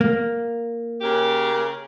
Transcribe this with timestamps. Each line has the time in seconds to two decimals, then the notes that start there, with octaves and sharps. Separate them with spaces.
0.01 A#3
1.01 C#3 G4 A#4